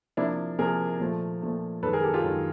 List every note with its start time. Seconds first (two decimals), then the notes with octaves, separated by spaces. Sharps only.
0.17 C3 F3 A#3 D4 E4
0.58 C3 F3 A#3 G#4 A#4
1.00 A#2 F3 A3
1.42 A#2 F3 A3
1.83 F#2 D#3 G#3 A4 B4
1.93 G#4 A#4
2.03 G4 A4
2.14 F4 G4
2.24 F#2 D#3 G#3